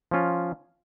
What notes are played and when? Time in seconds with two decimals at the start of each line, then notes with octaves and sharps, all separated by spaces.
0.11 F3 C#4 F4